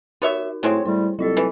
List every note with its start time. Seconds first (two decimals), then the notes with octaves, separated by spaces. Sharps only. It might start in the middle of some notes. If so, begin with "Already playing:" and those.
0.22 B3 D#4 F#4 A#4 C#5 E5
0.63 A2 F#3 G#3 C4 C#5
0.85 A2 G3 E4
1.19 C2 F#3 F4 A4 D#5
1.37 E3